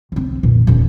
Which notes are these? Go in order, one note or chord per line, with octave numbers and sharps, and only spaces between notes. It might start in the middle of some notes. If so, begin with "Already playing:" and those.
C2 C4
F2 A#2
D#1 C#3